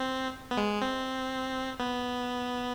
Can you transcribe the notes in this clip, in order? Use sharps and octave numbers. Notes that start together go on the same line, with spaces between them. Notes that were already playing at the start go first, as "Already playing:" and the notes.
Already playing: C4
B3
G#3
C4
B3